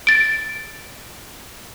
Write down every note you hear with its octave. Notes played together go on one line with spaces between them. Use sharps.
A6 D7